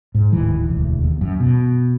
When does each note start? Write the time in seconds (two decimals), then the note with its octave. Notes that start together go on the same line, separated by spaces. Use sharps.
0.15 G#2
0.32 D1 D#3 E3
0.70 E1 D2
1.04 D#2
1.21 F#2
1.40 B2